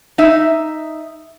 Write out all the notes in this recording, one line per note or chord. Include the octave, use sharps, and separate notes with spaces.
D#4 E5